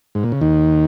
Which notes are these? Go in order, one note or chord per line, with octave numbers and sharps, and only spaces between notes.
G#2
A#2
C#3
D#2 D#3